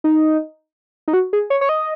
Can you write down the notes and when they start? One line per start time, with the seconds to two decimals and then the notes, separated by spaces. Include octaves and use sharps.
0.04 D#4
1.08 D#4
1.13 F#4
1.33 G#4
1.50 C#5
1.61 C#5
1.69 D#5